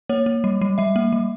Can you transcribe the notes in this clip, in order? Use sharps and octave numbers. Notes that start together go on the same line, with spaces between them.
A#3 C#5
A#3
G3
G3
G3 E5
A#3
G3